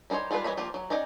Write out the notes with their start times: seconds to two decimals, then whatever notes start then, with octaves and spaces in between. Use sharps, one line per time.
0.10 G3 D#4 E4 C5 C#5
0.31 G3 G#3 F4 G#4 B4
0.44 E3 G3 C#5 D#5 B5
0.57 F3 A#3 F4 G4
0.74 F#3
0.90 C#4 D#4 D5 D#5 G5